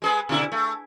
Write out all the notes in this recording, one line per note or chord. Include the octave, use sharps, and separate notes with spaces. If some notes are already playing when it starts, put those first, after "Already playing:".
G#3 G#4 B4
B2 D3 E4
A3